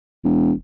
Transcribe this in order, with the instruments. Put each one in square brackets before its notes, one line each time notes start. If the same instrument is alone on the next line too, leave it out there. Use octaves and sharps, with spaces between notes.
[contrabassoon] E1